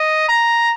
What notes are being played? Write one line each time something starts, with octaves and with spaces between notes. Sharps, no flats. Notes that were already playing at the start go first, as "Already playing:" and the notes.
Already playing: D#5
A#5